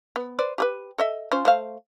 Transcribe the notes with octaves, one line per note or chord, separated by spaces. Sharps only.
B3
B4 C5 D5
G4 G#4 B4
A4 D#5 E5
C#4 F4 C5
A3 C5 F5